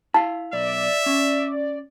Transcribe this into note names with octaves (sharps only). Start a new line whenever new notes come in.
E4 F5 A5
B1 D5 E5
C#4